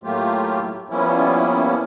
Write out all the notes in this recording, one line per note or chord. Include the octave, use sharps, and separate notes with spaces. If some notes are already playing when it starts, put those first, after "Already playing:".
A2 F#3 A3 A#3 F4 G4
F3 G3 A#3 B3 C#4 E4